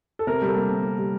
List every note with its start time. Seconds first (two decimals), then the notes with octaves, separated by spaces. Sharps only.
0.19 A4
0.27 C3 A#4
0.42 G3
0.48 A4
0.56 A#3
0.70 C3
0.84 C3
0.98 G3